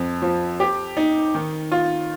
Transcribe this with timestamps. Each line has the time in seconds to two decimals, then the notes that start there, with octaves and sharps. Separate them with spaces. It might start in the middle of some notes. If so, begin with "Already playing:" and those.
Already playing: F2
0.22 F3
0.60 G4
0.97 D#4
1.35 D#3
1.72 F4